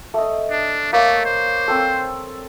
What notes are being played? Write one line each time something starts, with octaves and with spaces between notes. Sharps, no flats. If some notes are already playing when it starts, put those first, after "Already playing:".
A3 D#5
D4
A3 A#3 C#5
C5
C4 A4